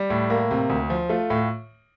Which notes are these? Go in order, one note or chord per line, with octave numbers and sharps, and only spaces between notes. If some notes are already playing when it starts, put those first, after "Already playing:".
Already playing: G3
A2
A#3
C3
D2
F3
A3 F4
A2